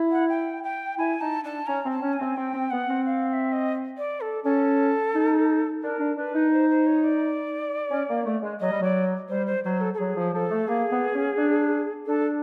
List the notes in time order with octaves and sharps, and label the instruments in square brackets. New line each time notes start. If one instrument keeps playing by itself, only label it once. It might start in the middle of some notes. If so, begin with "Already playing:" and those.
Already playing: [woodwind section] E4
[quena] F#5
G5
G5
[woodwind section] E4 [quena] G#5
[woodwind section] D#4 [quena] A5
[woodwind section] D4 [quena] A5
[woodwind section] C#4 [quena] A#5
[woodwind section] C4
[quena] A5
[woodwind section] C#4
[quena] G#5
[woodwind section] C4
[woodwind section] C4 [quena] G5
[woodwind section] C4
[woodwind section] B3 [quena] F#5
[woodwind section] C4
[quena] F5
F5
E5
D#5
D5
A4
[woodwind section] C#4 [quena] A4
[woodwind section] D#4
[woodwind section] D4 [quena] A#4
[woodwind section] D4
[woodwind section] D4 [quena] B4
[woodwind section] D#4
[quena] C5
C5
C#5
D5
[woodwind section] C#4
A#3
A3
G#3
[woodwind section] F#3 [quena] D#5
[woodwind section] G3
[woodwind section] F#3 [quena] D5
[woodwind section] G3 [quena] C5
[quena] C5
[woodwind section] F#3 [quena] C5
[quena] A4
A4
[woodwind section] F#3 [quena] G#4
[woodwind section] F3
[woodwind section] F3 [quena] A4
[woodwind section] A3
[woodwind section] A#3 [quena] G#4
[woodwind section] B3
C#4
D4
[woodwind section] D4 [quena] A4